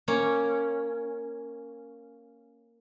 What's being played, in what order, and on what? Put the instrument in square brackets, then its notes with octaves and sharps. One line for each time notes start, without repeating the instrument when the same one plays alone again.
[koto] A#3 C#4